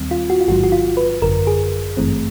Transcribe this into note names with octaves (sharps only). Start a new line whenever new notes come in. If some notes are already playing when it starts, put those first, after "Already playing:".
Already playing: D#2 D#3 G3 C4
F4
F#4
F4
A1 G#2 D#3 F#3 F#4
F#4
F4
B4
G#1 F#2 D3 A#4
G#4
G#1 G2 E3 A3 C4